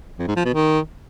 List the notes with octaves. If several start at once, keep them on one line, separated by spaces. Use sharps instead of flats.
F2
G#2
F3
B2
D#3